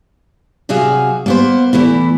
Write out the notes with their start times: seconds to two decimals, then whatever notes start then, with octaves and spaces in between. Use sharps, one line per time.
0.69 C3 F#3 F#4 G#4 E5 F5
1.26 A#3 B3 C5
1.73 E2 E3 A3 E4